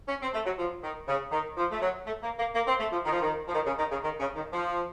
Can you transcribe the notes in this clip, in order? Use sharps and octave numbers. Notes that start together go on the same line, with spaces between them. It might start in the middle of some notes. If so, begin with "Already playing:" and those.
C#4
C4
A3
F#3
F3
D#3
C#3
D#3
F3
A3
F#3
A3
A#3
A#3
A#3
C4
A3
F3
D#3
F3
D#3
F3
D#3
C#3
D#3
C#3
D#3
C#3
D#3
F3